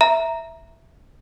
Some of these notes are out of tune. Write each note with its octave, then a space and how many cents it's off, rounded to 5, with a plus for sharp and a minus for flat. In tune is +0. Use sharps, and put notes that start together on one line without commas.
E5 +0 A#5 +0